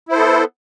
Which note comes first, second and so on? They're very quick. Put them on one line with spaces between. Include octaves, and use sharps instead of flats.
E4 C5 A4 B3